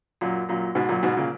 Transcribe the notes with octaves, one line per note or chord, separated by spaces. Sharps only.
F#2 A#2
F#2 A#2
G#2 B2
F#2 A#2
G#2 B2
A#2 C#3